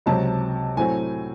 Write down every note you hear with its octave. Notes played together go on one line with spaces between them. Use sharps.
C#2 C3 F#3 C4 A5
A2 F#3 A3 C4 G#5